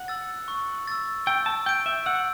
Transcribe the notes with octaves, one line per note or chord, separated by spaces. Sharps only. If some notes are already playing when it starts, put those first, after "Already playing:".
Already playing: F#5
E6 A6
C#6
E6 A6
G5 E6
A5
G5 G6 D7
E5
F#5 E6